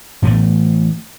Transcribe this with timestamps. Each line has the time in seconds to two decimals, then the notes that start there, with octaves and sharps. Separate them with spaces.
0.22 A2 E3 A3 B3